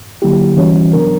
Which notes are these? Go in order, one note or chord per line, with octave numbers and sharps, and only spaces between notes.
D3 F#3 A#3 E4 G4
E3 G3 C#4 F#4 C#5
C#3 F#3 B3 D4 A#4